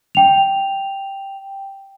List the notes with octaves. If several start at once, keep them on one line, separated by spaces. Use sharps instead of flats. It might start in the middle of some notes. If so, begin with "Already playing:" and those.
G5 F7